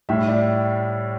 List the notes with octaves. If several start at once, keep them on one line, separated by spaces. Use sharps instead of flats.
A2 G3 E5
D5